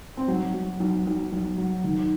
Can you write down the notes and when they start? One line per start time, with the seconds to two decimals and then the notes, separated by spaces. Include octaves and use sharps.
0.17 C4
0.28 F#3 D#4
0.54 F#3
0.80 B1
1.06 B1
1.32 B1
1.58 F#3
1.84 D#3